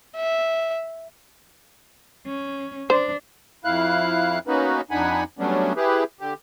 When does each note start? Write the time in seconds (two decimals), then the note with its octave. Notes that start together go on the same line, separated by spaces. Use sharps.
0.17 E5
2.26 C#4
2.90 D4 C5
3.65 F2 E4 F5 F#6
4.47 A#3 B3 C#4 D#4 F#4 B4
4.91 F2 D4 D#4 F#5 G#5 B5
5.39 F#3 G3 A3 B3 C#4 D4
5.77 E4 G4 G#4 B4
6.20 D3 G4